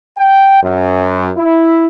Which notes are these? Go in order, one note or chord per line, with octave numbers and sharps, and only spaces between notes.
G5
F#2
E4